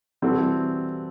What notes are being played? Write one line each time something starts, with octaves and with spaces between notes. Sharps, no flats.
E3 G3 C4 F#4 A4